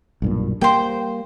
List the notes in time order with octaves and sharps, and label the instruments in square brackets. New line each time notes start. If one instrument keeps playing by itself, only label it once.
[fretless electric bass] B1 G2 A#2
[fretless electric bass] G3 A#3 [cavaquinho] C5 G5